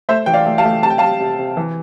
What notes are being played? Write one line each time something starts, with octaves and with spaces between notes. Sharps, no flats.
A3 C5 E5
E3 G5
D5 F5
A3
F5 A5
A3
C3 A5
G5
G3 F5 A5
C3
C3
E3